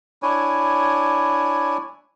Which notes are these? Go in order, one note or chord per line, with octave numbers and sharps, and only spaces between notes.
D4 E4 C#5 G#5